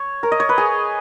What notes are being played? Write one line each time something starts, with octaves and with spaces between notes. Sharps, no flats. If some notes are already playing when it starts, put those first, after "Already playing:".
Already playing: C#5
A#4
D#5
C#5
B4
G#4